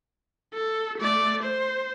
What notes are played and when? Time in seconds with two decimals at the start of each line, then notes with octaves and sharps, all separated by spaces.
0.54 A4
0.98 A3 D5
1.43 C5